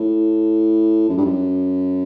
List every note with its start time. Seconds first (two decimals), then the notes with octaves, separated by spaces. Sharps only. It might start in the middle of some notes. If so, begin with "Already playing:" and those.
Already playing: A2
1.09 F#2
1.17 G2
1.25 F#2